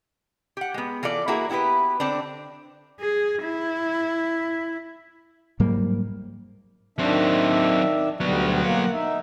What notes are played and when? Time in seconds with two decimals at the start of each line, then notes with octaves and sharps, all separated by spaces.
0.57 G4 F#5
0.74 G#3 B3
1.03 E3 F4 A4 D5
1.28 A#3 E4 F#4 G#4
1.49 B3 E4 F#4 G4 B4
2.00 D3 C4 D4
3.00 G#4
3.43 E4
5.60 G#2 F#3 G3 A#3
6.98 D#3 F#3 C4 D4 E5
8.20 D2 D3 F#3 G3 B3
8.60 A#3 F#5
8.92 D#4 E5